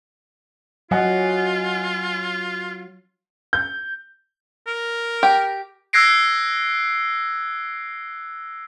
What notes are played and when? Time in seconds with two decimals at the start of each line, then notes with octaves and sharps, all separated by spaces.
0.91 F#3 F4 D#5 F#5 G#5
3.53 G6
4.67 A#4
5.23 G4
5.93 E6 F#6 G#6 A#6 C7 D7